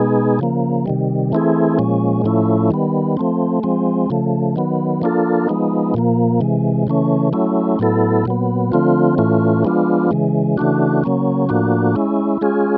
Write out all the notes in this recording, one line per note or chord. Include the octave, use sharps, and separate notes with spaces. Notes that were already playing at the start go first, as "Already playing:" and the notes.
Already playing: B2 G#3 B3 D#4 G#4
C#3 F3 A#3
C3 D#3 G3
E3 A3 C4 E4 G#4
A#2 F3 G#3 C#4
A2 F3 A3 C#4 E4
D#3 G3 B3
F3 A3 C4
F3 G#3 C4
C#3 F3 A3
D#3 F#3 B3
F3 A#3 D4 F4 A4
F3 G#3 B3 D#4
A#2 F3 A#3
C3 E3 G#3
C#3 E3 A3 C#4
F#3 A3 C#4 E4
A2 F#3 B3 E4 A4
A#2 F#3 B3
D3 F3 A3 C4 F4
A2 E3 A3 C#4 F4
F3 G#3 B3 D4 F4
C#3 E3 G#3
C#3 E3 A3 D4 F#4
C#3 F#3 A#3 C#4
A2 F3 A#3 D4 F#4
G#3 C#4 E4
G#3 C#4 F4 G#4